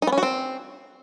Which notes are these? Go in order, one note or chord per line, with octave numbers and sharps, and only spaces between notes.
D#4
B3
C#4
F#4
C4